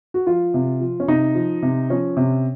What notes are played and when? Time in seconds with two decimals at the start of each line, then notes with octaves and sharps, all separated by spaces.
0.14 F#4
0.26 F3 F4
0.54 C3
0.81 F3
1.00 C#4
1.08 C3 D#4
1.35 F3
1.62 C3
1.90 F3 C#4
2.17 C3